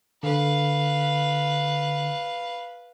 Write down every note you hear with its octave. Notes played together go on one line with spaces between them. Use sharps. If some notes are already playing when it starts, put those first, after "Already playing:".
D3 B4 F5